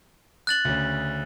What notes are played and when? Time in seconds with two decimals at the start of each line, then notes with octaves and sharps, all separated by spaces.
0.47 F#6 A6 F#7
0.65 D2 C#3